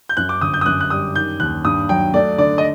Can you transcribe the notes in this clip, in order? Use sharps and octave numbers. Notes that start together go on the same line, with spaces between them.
G6
F#2 F#6
D6
G1 D#6
G6
D#6
F#2 F#6
F#6
G3 D#6
D#3 G6
D#2 F#6
G2 D#6
F#3 G5
A3 D5
D3 D5
D#5